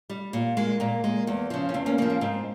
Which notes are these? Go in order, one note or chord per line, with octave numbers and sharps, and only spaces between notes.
G3
A#2
G#3 A#3
A#2 A#3
G#3
E2
C#3 F3
C#4
E2 C4
A#3 C#4
C#3 F3 A#3
A#3
G#2 C4